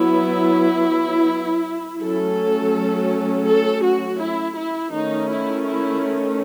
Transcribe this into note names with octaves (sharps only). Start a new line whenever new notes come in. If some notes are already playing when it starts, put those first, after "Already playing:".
Already playing: F#3 B3 E4
F#3 A3 C#4 A4
A4
F#4
E4
E4
D#3 A3 C#4 D#4
E4
E4